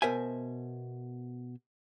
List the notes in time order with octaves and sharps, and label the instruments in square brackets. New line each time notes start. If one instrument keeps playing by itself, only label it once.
[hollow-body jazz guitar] B2 A#4 C5 E5 G#5